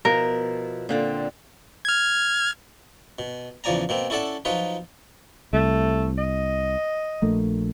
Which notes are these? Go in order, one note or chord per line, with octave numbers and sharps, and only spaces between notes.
B2 F3 E4 A#4
A#2 D3 C4
F6 G#6
B2
E2 C#3 F3 D5 G#5 A#5
B2 A#3 C4
C#4 E4 A4 D5 F#5 A5
F3 F#3 D#4 F4 B4
C2 A3
D#5
A#1 A3 A#3